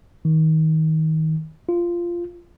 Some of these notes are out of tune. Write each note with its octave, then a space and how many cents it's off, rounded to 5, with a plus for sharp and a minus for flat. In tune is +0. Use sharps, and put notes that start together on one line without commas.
D#3 +25
F4 -10